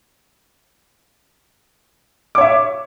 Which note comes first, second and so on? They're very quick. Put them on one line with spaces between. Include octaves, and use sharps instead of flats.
D6 C#5 E5